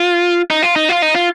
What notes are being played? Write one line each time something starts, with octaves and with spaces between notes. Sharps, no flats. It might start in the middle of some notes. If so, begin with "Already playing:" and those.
Already playing: F4
D#4
F4
D#4
F4
D#4
F4